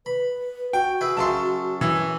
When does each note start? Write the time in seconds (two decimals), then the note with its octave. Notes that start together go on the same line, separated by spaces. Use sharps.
0.06 B4 B5
0.73 F#4 G5
1.01 E4 G#4 B4
1.17 F#2 C#3 A4 A5 C6
1.81 E3